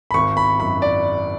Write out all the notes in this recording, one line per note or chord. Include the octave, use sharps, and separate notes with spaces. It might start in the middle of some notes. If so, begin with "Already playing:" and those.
B5
G#1 C#6
B5
F#2 B5
D5